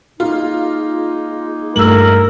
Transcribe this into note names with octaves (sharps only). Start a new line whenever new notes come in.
G#3 A#3 D#4 F4
G2 A3 A#4 E6 F#7